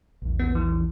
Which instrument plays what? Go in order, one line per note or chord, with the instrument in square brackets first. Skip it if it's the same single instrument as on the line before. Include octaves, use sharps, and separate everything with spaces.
[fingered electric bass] A#1 E2
[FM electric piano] B3
E3